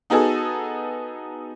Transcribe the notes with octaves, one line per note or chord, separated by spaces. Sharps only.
B3 D#4 F#4 G#4 A4